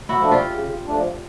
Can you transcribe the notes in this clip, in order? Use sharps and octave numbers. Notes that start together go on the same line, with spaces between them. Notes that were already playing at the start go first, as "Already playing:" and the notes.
E4 F#4
F3 A3 D4
F4 G4
C#3
F3 A3 D4